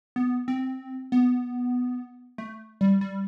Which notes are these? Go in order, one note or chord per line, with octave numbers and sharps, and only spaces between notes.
B3
C4
B3
A3
G3
G3